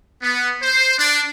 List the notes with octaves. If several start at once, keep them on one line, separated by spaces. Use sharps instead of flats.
B3
C5
D4